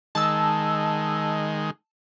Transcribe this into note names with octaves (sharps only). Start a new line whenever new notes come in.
D#3 G#3 A5 E6